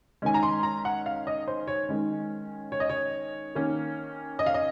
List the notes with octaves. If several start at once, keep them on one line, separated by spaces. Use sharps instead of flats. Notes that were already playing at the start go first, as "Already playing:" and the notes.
D#3 G#3 C#4 G#5
A#5
C6
A#5
F#5
F5
D#5
C5
C#5
D#3 G#3 C#4
C#5
D#5
C#5
D#3 A#3 C#4
D#5
F5
D#5